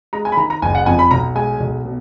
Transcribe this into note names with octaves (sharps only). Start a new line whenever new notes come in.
G#3 A#5
G#5
B5
D#3 A#5
A#5
F#1 G#5
F#5
F2 G#5
B5
B1 A#5
G#3 G#5
B1
B2